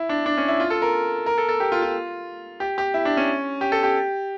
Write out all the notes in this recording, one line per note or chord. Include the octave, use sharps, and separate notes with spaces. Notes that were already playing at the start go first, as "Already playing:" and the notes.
Already playing: E4
D4
D4
C#4
E4
F4
A4
A#4
A#4
A4
A4
G4
F4
F4
G4
G4
E4
D4
C#4
G4
A4
G4